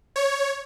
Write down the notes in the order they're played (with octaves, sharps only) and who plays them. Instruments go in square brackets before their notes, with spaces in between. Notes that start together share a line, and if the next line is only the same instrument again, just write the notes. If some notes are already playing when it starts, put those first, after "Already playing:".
[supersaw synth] C#5